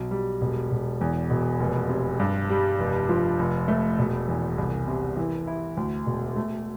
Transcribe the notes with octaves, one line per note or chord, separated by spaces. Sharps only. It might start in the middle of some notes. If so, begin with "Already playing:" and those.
Already playing: B1
G3
E1
E1
E2
E1
F1
C3
G2
G3
F1
F3
F1
A3
E1
E2
C2
C3
E3
E4
D2
E1
A3